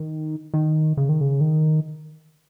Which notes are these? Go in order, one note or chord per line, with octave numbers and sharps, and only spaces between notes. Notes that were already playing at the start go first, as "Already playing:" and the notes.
Already playing: D#3
D#3
C#3
D#3
C#3
D#3